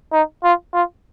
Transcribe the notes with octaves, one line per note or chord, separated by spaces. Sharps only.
D#4
F4
F4